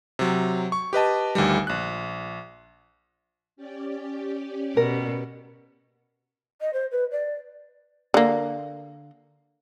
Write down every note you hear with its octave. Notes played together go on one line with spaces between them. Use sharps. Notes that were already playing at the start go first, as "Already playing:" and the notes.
C3 F#3
C#6
G4 B4 D#5 A5
G1 D2 D#3 G3
A#1 F#6
C#4 G4 D5
B2 A#4
D#5
C5
B4
D5
D3 A#3